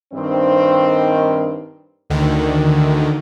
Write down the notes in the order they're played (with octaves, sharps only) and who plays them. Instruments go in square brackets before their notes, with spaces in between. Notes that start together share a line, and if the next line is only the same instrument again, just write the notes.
[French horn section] G2 D#3 C4
[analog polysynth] D2 D3 D#3